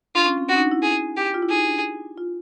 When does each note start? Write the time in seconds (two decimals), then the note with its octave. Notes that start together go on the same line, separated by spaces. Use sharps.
0.15 D4 F4
0.26 C#4
0.38 C4
0.49 C#4 F#4
0.56 D#4
0.60 D4
0.71 E4
0.83 G#4
1.17 G4
1.34 F4
1.42 E4
1.50 D#4 G#4
1.67 D4
2.18 F4